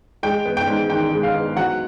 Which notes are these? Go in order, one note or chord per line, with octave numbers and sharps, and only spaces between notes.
G#3 G5
B3
G5
G#2
D#3 G5
G#3
F5
B3
F#3 F#5